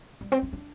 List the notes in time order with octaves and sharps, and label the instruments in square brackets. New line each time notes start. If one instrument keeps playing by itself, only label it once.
[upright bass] G3
C4
D4
D4